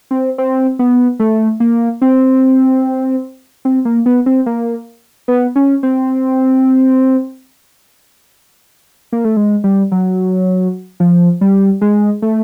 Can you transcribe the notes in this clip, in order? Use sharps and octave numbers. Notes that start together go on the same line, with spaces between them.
C4
C4
B3
A3
A#3
C4
C4
A#3
B3
C4
A#3
B3
C#4
C4
A#3
A3
G#3
G3
F#3
F3
G3
G#3
A3